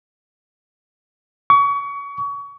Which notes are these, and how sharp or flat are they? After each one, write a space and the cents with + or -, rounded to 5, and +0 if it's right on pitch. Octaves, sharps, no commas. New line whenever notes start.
C#6 +30